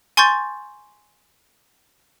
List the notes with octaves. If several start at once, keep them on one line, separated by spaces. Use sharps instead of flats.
G#5 C6 C#6 G6 A6